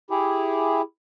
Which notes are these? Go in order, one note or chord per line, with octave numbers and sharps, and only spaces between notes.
E4 G4 G#4